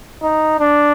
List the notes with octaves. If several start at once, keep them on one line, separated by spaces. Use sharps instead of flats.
D#4
D4